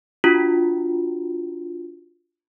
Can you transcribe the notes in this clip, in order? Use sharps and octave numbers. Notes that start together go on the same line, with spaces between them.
D4 F4 F#4